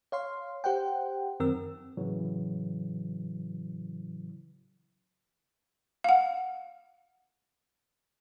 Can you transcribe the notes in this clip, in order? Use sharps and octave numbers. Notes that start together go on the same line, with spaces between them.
C#5 F5 C6
G4 C5 F#5 G5
F#2 D#3 C4 A#4 E6
A2 C#3 E3 F#3
F5 F#5